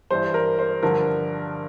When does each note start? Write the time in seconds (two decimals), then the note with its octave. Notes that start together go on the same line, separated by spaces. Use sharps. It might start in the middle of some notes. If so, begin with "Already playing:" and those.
0.10 G2 E3 G3 C5
0.34 A#4
0.59 C5
0.83 G2 D3 F3 A#4